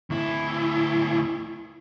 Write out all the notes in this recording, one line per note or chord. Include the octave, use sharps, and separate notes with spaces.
D2 E4